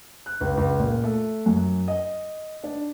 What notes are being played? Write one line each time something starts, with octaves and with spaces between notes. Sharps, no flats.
F#6
C#2
C#2
A#2
A3
F#2
D#5
D4